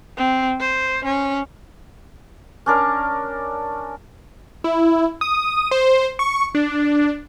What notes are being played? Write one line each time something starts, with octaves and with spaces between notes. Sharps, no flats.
C4
C5
C#4
C#4 D4 A#4
E4
D#6
C5
C#6
D4